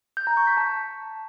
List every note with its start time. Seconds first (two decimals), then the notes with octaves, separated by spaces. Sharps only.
0.17 G6
0.27 A#5
0.37 C#6
0.47 B6
0.57 A5